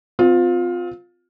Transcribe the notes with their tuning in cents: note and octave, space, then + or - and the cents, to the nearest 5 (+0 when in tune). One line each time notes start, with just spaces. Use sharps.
C4 -30 F4 +20